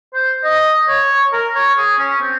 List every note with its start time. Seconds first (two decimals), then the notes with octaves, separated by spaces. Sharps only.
0.14 C5
0.44 D#5
0.88 C#5
1.32 A#4
1.55 C#5
1.77 G#4
1.99 C#4
2.22 C4